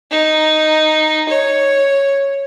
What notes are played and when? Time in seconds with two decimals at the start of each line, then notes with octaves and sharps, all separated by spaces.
0.11 D#4
1.29 C#5